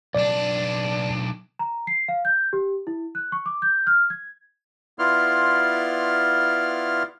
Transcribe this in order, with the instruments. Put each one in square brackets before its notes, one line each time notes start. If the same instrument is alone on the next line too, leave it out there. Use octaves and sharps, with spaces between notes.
[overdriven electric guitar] B1 D4 [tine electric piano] D5
[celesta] A#5
C7
F5
G6
G4
E4
F#6
C#6
D6
G6
F6
G#6
[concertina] B3 E4 F4 D5 C6 F6